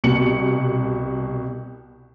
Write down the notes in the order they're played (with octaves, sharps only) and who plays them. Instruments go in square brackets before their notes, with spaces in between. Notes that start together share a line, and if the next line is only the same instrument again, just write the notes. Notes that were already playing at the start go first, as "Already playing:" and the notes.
[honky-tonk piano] C2 B2 C#7 F#7